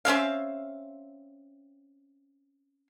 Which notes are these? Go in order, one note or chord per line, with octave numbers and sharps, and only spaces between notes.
C4 C#4 E5 F5